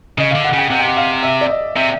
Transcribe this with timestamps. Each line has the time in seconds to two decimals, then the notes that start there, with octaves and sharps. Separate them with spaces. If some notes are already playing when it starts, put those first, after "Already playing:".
0.18 C#3 D#5
0.31 D3 F5
0.44 F#5
0.53 C#3 G5
0.70 C3 F#5
0.79 G5
0.87 F#5
0.97 F5
1.23 E5
1.41 D5
1.49 D#5
1.76 C3 E5